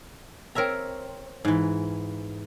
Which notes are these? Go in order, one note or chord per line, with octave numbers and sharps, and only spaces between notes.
C4 A#4 C#5 E5 A#5
G#2 E3